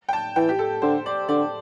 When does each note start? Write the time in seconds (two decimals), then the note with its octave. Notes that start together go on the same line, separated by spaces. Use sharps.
0.09 G5
0.13 A5
0.36 E3 G5
0.49 G4
0.59 A4
0.82 D3 C5
1.06 D5
1.28 D3 D5